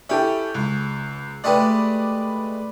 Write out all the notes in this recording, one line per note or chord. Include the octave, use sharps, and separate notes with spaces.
C#4 E4 G4 A4
C#2
G#3 A3 G4 B4 D5